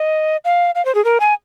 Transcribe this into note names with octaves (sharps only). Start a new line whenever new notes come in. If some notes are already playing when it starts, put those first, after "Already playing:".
Already playing: D#5
F5
F5
C5
G#4
A#4
G#5